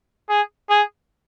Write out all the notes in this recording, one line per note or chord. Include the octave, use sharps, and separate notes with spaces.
G#4
G#4